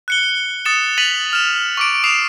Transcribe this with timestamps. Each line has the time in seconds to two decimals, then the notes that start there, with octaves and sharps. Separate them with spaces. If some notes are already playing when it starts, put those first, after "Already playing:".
0.08 F#6 C#7 G7
0.65 D#6 A6 C#7 E7
0.98 A6 B6 D#7 F7 F#7
1.33 F6 E7
1.77 C#6 D6 D7
2.04 D6 D#6 C7 E7 F7